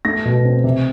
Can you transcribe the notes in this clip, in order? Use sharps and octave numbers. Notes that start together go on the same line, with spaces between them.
A3 A#6
B2
C4
C3